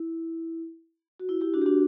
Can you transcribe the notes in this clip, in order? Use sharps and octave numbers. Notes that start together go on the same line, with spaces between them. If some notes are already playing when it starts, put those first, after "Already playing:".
Already playing: E4
F#4
E4
E4 G4
D4 F#4
G4
D4 F#4